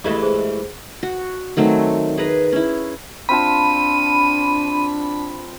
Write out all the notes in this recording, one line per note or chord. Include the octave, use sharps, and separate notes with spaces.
G2 E3 G#3 A3 E4
G#4 C5
F#4
D#3 F#3 A3 C4
G#4 B4 A#5
C#4 E4
C4 D4 F4 A5 B5 D#7